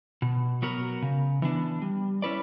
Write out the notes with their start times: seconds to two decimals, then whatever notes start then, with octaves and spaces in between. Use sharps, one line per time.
0.22 B2
0.62 F#3 B3 F#4 A#4
1.02 C#3
1.42 E3 B3 D4
1.82 G3
2.22 C#4 E4 B4 D5